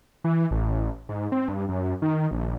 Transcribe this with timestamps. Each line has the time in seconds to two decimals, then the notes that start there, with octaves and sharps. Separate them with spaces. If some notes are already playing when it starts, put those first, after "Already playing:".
0.24 E3
0.51 A1
1.09 G#2
1.32 C4
1.48 G2
1.69 F#2
2.02 D#3
2.31 A#1